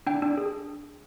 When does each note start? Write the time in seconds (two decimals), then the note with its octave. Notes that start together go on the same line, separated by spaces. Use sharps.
0.07 D4 G5
0.22 D4
0.37 G#4